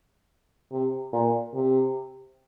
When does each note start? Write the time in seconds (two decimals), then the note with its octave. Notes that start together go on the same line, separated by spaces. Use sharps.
0.72 C3
1.13 A#2
1.54 C3